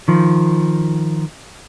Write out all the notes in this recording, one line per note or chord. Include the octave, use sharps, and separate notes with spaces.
D#3 F3